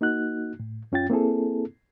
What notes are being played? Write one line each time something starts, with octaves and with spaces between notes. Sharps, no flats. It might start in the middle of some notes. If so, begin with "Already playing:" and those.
A#3 D#4 F#4 F#6
A2
F#2 C#4 F4 G5 A6
A#3 C4 E4 G#4 A4